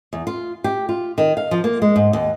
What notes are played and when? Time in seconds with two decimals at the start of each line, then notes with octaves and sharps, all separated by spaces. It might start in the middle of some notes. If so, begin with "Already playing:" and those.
0.13 E2
0.27 F4
0.64 G4
0.89 F4
1.18 D#3
1.37 F5
1.51 F3
1.64 A#3
1.82 G#3
1.96 G#2
2.13 D#2